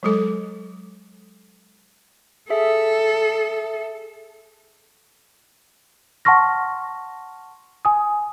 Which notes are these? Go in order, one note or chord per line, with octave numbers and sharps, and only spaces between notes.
F#3 G#3 A4
G#4 A4 E5 B6
F#5 A5 C6 C#6 F6 A#6
G#5 D#6